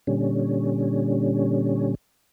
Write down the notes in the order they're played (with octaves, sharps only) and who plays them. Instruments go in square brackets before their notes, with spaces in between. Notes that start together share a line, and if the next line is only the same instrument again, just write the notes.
[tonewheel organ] A#2 D3 G3 C#4